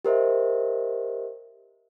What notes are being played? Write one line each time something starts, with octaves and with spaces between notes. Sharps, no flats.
G4 A#4 C5 D#5 E5